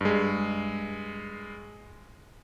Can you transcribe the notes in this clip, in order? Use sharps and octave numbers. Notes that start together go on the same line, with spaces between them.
G2 G#3